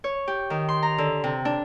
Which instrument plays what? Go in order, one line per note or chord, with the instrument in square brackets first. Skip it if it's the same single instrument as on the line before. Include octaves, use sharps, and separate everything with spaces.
[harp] C#5
G4
D#3
C6
A#5
D3
C3
D4